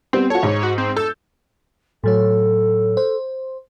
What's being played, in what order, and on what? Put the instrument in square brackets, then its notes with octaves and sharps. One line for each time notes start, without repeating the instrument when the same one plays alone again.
[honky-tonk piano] G3 B3 [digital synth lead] C4
[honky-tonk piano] F#4 A4 [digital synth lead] C#5
[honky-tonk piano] G#2
[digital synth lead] F#4
C4
[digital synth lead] A4 [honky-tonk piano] E6 G6
[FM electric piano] A2 F#3 C#5 [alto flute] A4
[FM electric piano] C5